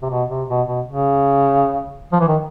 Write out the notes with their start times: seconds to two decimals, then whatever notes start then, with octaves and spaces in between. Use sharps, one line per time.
0.02 C3
0.10 B2
0.29 C3
0.48 B2
0.67 B2
0.85 C#3
2.12 F3
2.20 E3
2.28 D#3